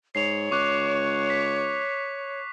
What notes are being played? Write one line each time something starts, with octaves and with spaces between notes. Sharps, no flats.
G#2 C#5 C7 F7
C#2 C#6 D6 F#6
B6